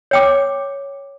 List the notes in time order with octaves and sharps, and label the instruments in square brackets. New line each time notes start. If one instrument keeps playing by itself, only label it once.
[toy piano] C#5 G5 D6